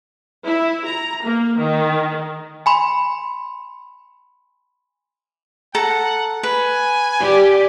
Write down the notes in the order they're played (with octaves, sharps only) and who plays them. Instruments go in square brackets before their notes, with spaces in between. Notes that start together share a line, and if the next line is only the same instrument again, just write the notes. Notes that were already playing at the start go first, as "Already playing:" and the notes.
[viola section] E4
A#5
A#3
D#3
[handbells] G#5 B5 C6
[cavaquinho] A4 A#5 [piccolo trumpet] F#5
[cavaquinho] B4 [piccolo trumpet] G#5
[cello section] G4 D5